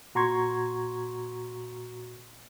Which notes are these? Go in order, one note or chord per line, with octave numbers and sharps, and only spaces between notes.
A#2 F#4 A#5 C6 C#6 G#6